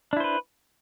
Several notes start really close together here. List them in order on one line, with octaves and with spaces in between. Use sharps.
D4 E4 C5 B4